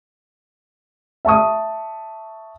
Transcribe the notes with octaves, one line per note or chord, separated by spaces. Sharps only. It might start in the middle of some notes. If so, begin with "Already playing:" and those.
E5 A5 C#6 D#6